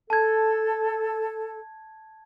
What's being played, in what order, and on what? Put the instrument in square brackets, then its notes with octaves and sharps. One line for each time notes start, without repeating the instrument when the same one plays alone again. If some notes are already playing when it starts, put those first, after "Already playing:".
[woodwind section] A4 [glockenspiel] A5 G#6